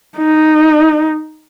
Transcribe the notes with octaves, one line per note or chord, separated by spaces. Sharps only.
D#4